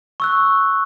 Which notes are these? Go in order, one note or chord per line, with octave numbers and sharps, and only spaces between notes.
C#6 E6 F#6